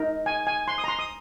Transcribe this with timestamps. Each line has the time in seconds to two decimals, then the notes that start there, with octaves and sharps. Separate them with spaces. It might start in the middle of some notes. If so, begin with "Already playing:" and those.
Already playing: D#4 A#4
0.26 G#5
0.47 G#5
0.68 C6
0.78 D#6
0.84 A#5
0.88 C6
0.99 D#6